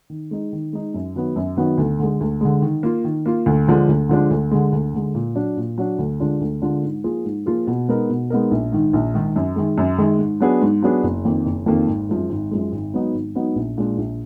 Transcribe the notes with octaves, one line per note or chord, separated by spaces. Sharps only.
D#3
G#3 D#4
D#3
G#3 D#4
F#2
D#3 F#3 B3
F#2
D#3 F#3 B3
D2
D3 G#3
D2
D3 G#3
D#3
A#3 F4
D#3
A#3 F4
D2
D3 F3 G#3 D4
D2
D3 F3 G#3 D4
D2
D3 G#3
D2
D3 G#3
A#2
F#3 D4
A#2
F#3 D4
D2
D3 G#3 D4 F4
D2
D3 G#3 D4 F4
G#2
F3 A#3 F4 G#4
G#2
F3 A#3 F4 G#4
B2
G#3 B3 D#4 A#4
B2
G#3 B3 D#4 A#4
A#1
G#2 D#3
A#1
G#2 D#3
F#2
D#3 G#3
F#2
D#3 G#3
G#2
F#3 B3 D4 G#4
G#2
F#3 B3 D4 G#4
F#1
F2 D#3 A#3
F#1
F2 D#3 A#3
G#1
F#2 F3 G#3
G#1
F#2 F3 G#3
G#1
G#2 F#3 B3 D#4
G#1
G#2 F#3 B3 D#4
A#1
A#2 G#3 D4
A#1